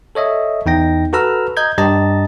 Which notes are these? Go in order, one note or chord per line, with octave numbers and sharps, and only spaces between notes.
A4 C#5 D#5 E5
E2 D#4 G5 A#6
F#4 A4 B4 A#5 E6 F6
D#5 A#5 G6 G#6
G2 G4 D#5 A5 A#5 A6